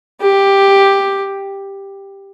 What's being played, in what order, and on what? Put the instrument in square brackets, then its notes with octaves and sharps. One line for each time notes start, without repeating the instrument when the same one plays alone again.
[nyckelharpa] G4